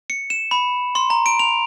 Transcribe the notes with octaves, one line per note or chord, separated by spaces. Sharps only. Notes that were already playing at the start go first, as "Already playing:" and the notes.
C#7
E7
B5
C6
A#5
D7
F7